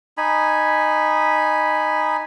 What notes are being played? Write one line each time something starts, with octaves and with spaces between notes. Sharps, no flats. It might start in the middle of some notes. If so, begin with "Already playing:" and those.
D#4 G#5 B5